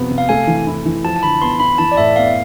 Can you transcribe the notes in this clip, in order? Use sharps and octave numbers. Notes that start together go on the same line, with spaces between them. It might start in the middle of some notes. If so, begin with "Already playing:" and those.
Already playing: C3 F3 B3
C3
F5
A3 G#5
E3
E4
E3
F3 A5
A5
D3 B5
B3 C6
E4 B5
E3 A5
D5
A2 E5
B3 F5